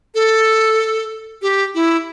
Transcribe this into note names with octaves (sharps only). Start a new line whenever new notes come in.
A4
G4
E4